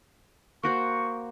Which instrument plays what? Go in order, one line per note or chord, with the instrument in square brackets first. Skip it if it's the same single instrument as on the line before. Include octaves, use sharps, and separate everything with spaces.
[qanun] A#3 F#4 C5 [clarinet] C#6